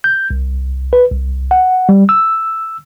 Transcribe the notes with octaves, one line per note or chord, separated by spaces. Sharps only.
G6
C2
B4
C2
F#5
G3
E6